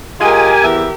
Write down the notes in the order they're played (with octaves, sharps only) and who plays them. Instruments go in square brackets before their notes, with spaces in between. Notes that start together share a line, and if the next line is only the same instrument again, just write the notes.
[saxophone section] G#3 F4 D#5 [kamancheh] G4 A#4 [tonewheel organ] G#5
[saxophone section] E2 E3 E5